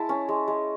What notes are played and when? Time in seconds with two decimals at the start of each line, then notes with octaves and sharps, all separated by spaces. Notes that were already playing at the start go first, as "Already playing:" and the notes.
Already playing: G#3 E4 A5
0.09 C#4
0.29 G#3
0.48 G#3